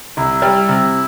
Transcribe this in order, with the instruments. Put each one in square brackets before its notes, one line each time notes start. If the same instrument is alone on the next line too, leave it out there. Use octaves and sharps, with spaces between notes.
[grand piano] C2 [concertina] E4
[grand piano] G3
C3